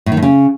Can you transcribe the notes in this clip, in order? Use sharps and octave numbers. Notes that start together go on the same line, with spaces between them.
A2
D#3
A2
C#3